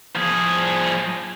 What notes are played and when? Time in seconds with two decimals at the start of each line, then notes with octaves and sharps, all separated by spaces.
0.15 F3 G#4